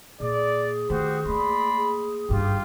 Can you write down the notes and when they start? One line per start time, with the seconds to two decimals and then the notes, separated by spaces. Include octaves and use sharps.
0.20 A#2 G#4 D5
0.90 D#3 A3 F#4 G4 C5
1.26 A3 A#3 D5 B5 C6
1.76 G#4
2.29 G#1 G2 F4 G4